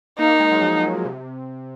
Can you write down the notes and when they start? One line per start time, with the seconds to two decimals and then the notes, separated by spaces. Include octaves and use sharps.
0.19 A#3 D#4
0.40 G#3
0.51 F#3
0.61 F3
0.83 F#3
1.05 C3